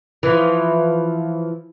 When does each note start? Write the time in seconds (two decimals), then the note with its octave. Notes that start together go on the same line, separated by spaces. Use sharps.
0.23 E3 F3